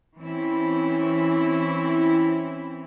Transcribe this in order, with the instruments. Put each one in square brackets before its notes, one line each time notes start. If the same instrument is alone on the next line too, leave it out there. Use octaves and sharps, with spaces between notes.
[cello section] E3 C4 C#4 E4